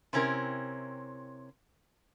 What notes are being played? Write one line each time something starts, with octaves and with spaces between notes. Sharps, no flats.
C3 C4 C#4 E4 G4 A#4